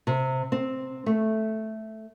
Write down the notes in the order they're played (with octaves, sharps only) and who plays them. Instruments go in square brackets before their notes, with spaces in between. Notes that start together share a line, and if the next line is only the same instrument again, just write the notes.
[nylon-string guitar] C3
C4
A3